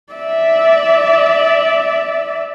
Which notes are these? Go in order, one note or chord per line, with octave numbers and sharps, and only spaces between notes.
D5 E5